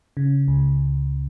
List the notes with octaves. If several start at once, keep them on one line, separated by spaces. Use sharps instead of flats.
C#3
C#2